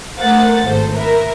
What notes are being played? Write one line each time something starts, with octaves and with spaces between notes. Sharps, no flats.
A3 A#4 C5 F#5 A6
G#1 A2 A4 C5
A#4 B4 E5